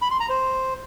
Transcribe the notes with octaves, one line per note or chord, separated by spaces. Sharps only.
B5
C6
A#5
C5